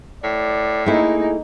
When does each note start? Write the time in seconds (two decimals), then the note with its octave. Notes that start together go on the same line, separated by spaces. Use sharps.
0.23 A2 D5
0.86 A3 A#3 D#4 E4 G#4